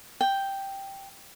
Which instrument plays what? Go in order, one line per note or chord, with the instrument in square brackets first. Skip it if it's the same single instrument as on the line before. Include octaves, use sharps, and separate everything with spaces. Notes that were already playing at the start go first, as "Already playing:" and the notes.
[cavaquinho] G5